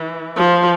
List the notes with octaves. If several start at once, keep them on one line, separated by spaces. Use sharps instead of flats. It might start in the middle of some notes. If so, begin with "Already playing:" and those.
Already playing: E3
F3